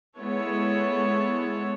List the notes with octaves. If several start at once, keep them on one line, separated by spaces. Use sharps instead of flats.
G#3 B3 E4 A4 C#5